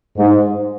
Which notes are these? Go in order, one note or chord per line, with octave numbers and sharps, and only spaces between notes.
G#2